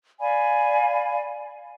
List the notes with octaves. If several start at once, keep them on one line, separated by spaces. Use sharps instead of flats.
D5 F5 G#5 B5